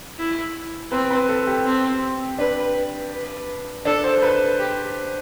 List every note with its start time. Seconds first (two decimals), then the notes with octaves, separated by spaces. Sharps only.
0.18 E4
0.91 C4 B4
1.10 B4
1.29 A4
1.47 G4
1.65 C4
2.38 D4 B4
3.12 B4
3.85 D4 A4
4.04 C5
4.22 B4
4.59 G4